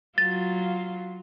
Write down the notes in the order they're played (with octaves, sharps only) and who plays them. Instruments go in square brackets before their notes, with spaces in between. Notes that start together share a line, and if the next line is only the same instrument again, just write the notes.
[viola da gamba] F#3 F4 [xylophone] A6